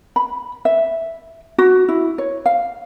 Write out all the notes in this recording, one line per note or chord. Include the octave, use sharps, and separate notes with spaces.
B5
E5
F#4
E4
C#5
F5